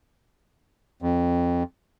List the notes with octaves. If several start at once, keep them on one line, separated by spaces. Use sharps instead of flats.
F2